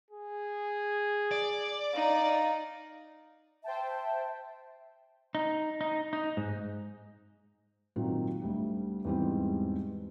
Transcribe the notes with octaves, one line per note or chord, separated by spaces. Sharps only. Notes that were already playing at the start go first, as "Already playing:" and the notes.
G#4
D5
D#4 F5
C5 E5 G5 A5
D#4
D#4
D#4
G#2
A#2 D#3 F#3 C4 F4
D2 G3
E2 G#2 G3 G#3 C4